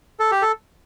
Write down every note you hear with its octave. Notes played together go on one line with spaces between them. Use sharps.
A4
G4
A4